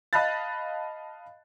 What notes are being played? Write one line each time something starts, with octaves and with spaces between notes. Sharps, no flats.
D#5 F5 A5 B5 F#6 A6